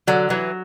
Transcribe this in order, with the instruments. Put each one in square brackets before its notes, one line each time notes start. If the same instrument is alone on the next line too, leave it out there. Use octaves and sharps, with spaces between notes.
[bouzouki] D3 [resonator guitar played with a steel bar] F#3
[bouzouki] E3 [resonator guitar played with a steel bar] F#3